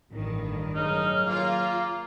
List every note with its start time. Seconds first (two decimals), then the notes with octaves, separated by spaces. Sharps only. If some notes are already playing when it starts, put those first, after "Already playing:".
0.12 A1 G2 D#3
0.75 C#3 F#3 D#4 F6
1.27 A#3 F4